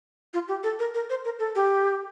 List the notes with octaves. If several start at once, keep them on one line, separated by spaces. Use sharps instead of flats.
F4
G4
A4
A#4
A#4
C5
A#4
A4
G4